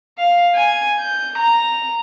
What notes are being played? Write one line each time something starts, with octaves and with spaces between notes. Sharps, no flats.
F5
G#5
G6
A#5